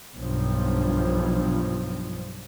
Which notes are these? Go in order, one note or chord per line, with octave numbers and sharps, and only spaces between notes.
B1 G2 F3